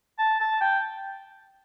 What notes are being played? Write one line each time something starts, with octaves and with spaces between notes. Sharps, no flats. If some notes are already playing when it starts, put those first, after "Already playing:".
A5
A5
G5